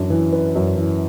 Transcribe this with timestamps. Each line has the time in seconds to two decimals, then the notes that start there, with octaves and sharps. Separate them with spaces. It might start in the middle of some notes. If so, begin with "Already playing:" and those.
Already playing: F#2 E3 D4
0.10 E3
0.32 B4
0.55 F#2
0.77 E3